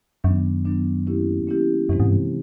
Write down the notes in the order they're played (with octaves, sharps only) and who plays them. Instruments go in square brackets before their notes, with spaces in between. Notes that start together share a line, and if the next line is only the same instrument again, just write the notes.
[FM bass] F#2 [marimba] D#3 F#3 B3 D4
[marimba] D#3 F#3 B3 D4
A#3 C#4 E4 G4
A#3 C#4 E4 G4
[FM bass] F#2 [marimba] C3 E3 G#3 C4
[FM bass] G#2
G2